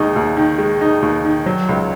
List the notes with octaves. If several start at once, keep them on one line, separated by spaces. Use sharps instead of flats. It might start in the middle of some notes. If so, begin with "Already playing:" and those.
Already playing: D#2 G#3 D#4
D#2
D#3
G#3
D#4
D#2
D#3
F#3
C#2